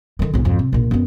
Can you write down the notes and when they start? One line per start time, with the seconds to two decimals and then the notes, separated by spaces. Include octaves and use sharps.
0.19 D3 D#3
0.34 B1 G#2
0.45 F2 G#2
0.59 C3
0.73 A#1 A#2
0.91 F#2 B3